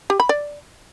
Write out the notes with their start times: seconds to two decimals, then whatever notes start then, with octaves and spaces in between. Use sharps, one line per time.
0.10 G4
0.20 B5
0.29 D5